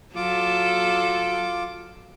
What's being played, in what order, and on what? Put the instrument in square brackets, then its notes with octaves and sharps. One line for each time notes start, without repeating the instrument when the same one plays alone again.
[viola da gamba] F#3 A4 [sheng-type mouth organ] F4 D6